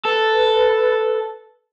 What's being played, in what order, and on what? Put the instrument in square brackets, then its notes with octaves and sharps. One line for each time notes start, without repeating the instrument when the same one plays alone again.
[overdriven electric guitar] A4 [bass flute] B4